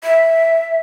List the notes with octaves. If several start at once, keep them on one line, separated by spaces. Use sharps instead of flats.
E5